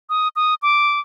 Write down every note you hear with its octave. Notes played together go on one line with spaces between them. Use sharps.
D#6
D#6
D6